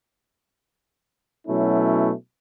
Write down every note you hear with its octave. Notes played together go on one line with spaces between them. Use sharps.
B2 F#3 A3 C#4 E4